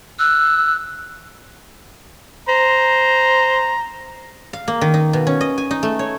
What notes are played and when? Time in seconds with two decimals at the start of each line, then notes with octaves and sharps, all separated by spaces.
0.19 E6 F#6
2.49 C5 A#5
4.53 F5
4.68 A#3
4.81 D#3
4.94 D#4
5.13 B2
5.27 C#4
5.41 D#5
5.58 G#5
5.71 D#4
5.83 A3
5.99 C#5